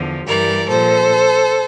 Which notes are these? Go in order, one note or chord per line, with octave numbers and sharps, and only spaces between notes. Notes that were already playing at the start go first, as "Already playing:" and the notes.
Already playing: E2 D3 F3
G2 E3 G3 A#4 D5
A#2 F3 A4 C5